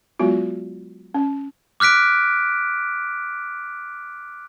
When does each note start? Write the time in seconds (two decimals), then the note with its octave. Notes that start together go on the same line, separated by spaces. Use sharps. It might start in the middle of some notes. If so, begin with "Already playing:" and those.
0.20 F#3 G#3 B3 F4 F#4
1.14 C#4
1.80 D6 F6 F#6 B6 D7